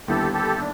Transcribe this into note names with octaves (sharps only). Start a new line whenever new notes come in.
D#2 D3 G3 B3 E4 G4 A4
G4 A4
D4